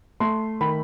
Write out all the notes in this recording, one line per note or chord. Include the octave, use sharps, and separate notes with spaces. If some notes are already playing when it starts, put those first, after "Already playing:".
A3 C6
D#3 B5